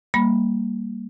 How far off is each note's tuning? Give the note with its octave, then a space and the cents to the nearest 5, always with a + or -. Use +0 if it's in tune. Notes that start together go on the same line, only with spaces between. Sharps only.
G3 +0 A#3 +0 B5 -10